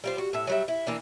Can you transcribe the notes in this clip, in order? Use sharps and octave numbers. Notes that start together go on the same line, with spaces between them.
G3 F4 C5
F#4
A2 E5
F#3 G3 E5
E4
E3 A#3 D4